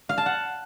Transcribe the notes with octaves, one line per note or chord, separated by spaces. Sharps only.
F5
A5
F#5